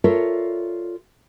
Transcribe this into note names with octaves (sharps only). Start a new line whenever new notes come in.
F4 A4 A#4 C#5 D5 E5